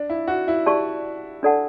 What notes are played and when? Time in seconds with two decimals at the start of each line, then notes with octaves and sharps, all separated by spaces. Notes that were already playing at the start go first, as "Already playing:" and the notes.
Already playing: D4
0.10 E4
0.28 F#4
0.48 E4
0.66 G4 D5 A5 C#6
1.43 D4 A4 D5 F#5 A5